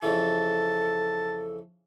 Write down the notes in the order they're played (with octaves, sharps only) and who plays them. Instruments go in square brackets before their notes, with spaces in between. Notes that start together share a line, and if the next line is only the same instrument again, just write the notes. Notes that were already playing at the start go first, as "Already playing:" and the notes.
[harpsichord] F2 C#3 E3 [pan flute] A4 [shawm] A5